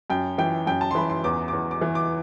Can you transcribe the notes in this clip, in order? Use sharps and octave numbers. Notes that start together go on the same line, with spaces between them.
F#2 G5
E3 G5
F#2 G5
A5
C6
E3 B5
C6
E2 D6
E2 D6
D6
E3
D6